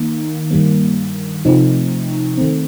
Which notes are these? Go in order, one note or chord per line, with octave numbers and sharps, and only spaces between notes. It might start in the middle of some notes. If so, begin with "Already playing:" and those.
Already playing: D#3 A#3 D#4
G2 D#3 G3 A#3
C3 F3 A3 C4 D#4
D#3 A3 C4